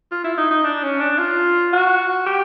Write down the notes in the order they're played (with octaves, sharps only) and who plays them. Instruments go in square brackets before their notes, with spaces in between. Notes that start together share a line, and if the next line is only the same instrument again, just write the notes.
[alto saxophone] F4
E4
D#4
D#4
D4
C#4
D4
F4
F#4
G4